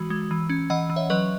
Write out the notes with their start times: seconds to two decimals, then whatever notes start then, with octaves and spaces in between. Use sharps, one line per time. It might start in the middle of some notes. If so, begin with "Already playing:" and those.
Already playing: E3 G#3 F#4
0.10 G#3
0.31 E3
0.49 C#4
0.70 E3 D#5 F#5
0.90 E3
0.96 C#5 E5
1.10 F#3 B4 D#5